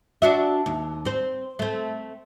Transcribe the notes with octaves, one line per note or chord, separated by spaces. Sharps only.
D4 F#4 E5
D#2
C4 C5
A3 C4